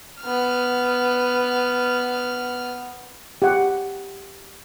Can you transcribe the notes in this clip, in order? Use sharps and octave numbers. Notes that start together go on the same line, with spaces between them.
B3 F6
G4 F#5